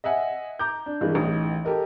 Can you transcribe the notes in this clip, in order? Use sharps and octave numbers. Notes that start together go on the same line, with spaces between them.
D#5 E5 F#5 G#5
A#5 D6 G6
D4
G2 D#3 E3 G#3
A1 D#4
G4 A4 A#4 D#5